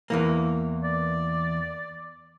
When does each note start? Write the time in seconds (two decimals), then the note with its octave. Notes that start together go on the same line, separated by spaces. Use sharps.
0.10 E2 E3 A#3
0.84 D5